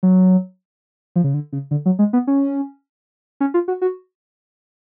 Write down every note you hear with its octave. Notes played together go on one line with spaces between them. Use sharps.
F#3
F3
C#3
D3
C#3
D3
F#3
G#3
B3
C#4
C#4
F4
F#4
F#4